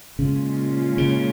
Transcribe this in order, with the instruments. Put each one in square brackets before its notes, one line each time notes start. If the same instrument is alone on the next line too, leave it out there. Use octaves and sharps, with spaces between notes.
[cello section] A#2 G#3 C#4 F4 [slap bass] C#3
[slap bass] C#3